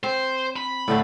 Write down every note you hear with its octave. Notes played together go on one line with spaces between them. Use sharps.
C4 C5
B5
A2 D3 A3